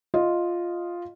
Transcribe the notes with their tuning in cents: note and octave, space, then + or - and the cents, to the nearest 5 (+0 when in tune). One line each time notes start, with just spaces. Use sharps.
F4 +0 D#5 +0